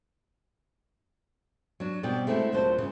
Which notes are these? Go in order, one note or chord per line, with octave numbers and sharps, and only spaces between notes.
F#3 D4
B2 G3 C4 D5 G5
G#3 A3 C4 C#4 E4 F#4
D2 A#2 F#3 C5 A5
C#3 E3 G#3